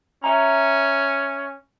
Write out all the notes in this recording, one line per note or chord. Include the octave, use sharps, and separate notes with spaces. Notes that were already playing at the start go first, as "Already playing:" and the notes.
C#4 E5 A#5